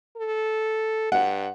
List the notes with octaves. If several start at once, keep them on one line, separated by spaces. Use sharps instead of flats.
A4
G2 F#5